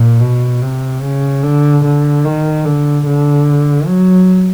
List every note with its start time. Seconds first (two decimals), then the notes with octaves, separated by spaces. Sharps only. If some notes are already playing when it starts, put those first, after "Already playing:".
Already playing: A#2
0.21 B2
0.62 C3
1.03 C#3
1.44 D3
1.84 D3
2.25 D#3
2.65 D3
3.06 D3
3.88 F#3